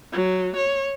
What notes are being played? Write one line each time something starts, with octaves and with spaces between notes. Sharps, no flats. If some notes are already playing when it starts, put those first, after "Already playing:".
F#3
C#5